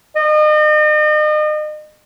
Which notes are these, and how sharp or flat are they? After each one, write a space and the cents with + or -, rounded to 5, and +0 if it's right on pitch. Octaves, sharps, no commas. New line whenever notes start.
D#5 -40